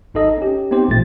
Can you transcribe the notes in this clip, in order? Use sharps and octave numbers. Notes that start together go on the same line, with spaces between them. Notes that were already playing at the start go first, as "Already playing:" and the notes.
G#1 D#4 A4 D#5
C#4 G4
B3 C4 D#4 G4 C5
A1 A#2 F3 A3 A6